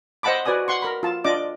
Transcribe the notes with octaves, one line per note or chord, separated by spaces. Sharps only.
C5 D#5 F#5 A5 B5 D6
F#4 B4 D5 G#5 D#6
F#5 C6 C#6
A#4 B5
F4 A5
D4 F4 D5 D#5 D6